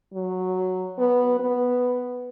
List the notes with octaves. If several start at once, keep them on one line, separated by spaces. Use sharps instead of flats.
F#3
B3
B3